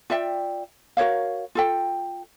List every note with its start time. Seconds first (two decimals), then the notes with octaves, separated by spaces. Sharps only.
0.10 F4 D5 E5 G5
0.97 F#4 A#4 C#5 F5
1.55 F4 A4 G5